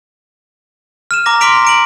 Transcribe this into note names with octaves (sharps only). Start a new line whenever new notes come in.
F6 D#7 E7
A#5 D6 A#6
C6 D6 F6 B6 D7 F7
A#5 D7 F#7